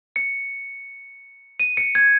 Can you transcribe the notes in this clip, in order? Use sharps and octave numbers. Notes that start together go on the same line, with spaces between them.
C#7
D#7
C#7
G#6